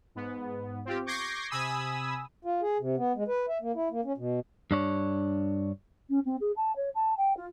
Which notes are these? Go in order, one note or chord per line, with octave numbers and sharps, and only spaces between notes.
G#2 B3
C4 F4 G4
C#6 D6 G6 G#6 A#6 C7
C3 G#5 B5 D#6 E6
F4
G#4
C3
B3
G#3
B4
E5
A#3
E4
A#3
C#4
B2
G2 D4 C#5
C#4
C4
G#4
A5
C#5
A5
G5
F4